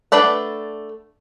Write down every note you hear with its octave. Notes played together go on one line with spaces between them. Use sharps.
A3 D4 B4 D5 F#5